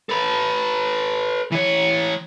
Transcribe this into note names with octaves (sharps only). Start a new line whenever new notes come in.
A4 B4
E3 C#5